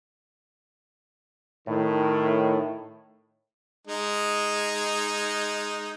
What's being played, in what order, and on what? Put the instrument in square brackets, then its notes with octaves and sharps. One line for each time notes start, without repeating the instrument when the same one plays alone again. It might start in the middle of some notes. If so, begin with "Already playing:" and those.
[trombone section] A2 D#3
[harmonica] G#3 D#4